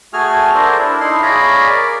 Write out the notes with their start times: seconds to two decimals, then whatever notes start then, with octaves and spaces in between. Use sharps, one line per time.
0.13 A3 F#4 G#4 G#5 F6
0.54 D4 A4 A#4 C5
0.79 D4 E4
1.00 D#4 E4 C6
1.22 G#4 C#5 D5 F5 A#5 B5
1.70 A#4 D5